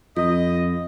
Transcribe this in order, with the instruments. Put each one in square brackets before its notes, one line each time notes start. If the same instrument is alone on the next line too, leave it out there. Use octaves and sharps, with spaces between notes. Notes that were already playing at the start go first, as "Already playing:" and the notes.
[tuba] F2 [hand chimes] F4 [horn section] D#5